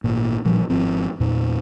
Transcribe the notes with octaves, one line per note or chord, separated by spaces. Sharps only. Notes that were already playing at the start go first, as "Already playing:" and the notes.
G#1 A#2
A1 A#2 F3 G3
G#1 F3 C4
E2 A#2